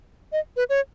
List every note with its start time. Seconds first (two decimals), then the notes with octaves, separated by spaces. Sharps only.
0.32 D#5
0.57 B4
0.69 C#5